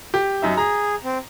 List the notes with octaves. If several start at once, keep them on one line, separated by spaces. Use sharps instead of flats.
G4
F#2 D#4 E5
G#4 A#5
C4